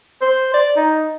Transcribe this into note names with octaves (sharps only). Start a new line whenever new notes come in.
C5
D5
D#4